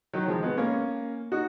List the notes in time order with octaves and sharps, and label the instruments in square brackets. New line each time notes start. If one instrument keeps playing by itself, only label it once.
[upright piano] D#3 F#3
F3 G#3
G#3 B3
A#3 C#4
D#4 F#4